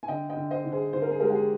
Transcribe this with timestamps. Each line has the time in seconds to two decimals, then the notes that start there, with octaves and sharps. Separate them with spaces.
0.03 G#5
0.08 D3 D#5 G5
0.30 D#5 G5
0.37 D3
0.51 C5 D#5
0.65 D3
0.72 G#4 C5
0.93 D3 C5
1.02 A#4
1.11 G#4
1.20 G#3 G4 A#4
1.30 G4
1.35 G#4